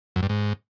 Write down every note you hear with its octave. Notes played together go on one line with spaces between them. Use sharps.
F#2
G2
G#2